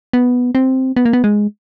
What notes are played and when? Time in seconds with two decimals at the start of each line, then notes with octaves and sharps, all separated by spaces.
0.13 B3
0.55 C4
0.97 B3
1.05 A#3
1.13 B3
1.24 G#3